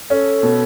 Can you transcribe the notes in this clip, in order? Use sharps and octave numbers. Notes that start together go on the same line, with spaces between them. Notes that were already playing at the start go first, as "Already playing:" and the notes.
C#4 A4
B2